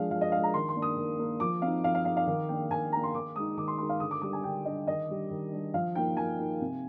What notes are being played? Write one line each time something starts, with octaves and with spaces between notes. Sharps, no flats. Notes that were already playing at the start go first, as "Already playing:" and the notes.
Already playing: F3 G#3 D4 F5
F3 F5
D#5
G#3 D4 F5
A#5
D#3 C6
C6
A#3 D4
D#6
D#3
A#3 D4
F3 D6
C4 D#4 F5
F3 F5
F5
C4 D#4 F5
F5
D#3 F5
A#3 D4 G5
D#3 G#5
A#3 D4 A#5
C6
D#3 D6
G#3 D#4 D#6
D#3 D6
C6
G#3 D#4 C6
F5
D3 D#6
D6
G3 D4 D6
G#5
D3 G5
G3 D4 D#5
D#3 D#5
G3 D4
D#3
G3 D4
F3 F5
A#3 D#4 G5
F3 G#5
A#3 D#4
C3